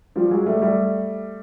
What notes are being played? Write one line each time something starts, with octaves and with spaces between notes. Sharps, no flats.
F3 G3
F#3 G#3
G3 A3
G3 A3